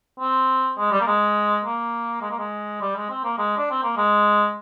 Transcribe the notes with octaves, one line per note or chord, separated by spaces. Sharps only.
C4
G#3
G3
A#3
G#3
A#3
G#3
A#3
G#3
G3
G#3
C4
A#3
G#3
D4
C4
A#3
G#3